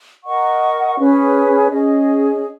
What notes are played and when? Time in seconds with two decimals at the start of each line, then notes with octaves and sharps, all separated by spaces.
0.23 A#4 D#5 F#5 C#6
0.98 C#4 G#4 B4
1.71 C#4 G#4 D#5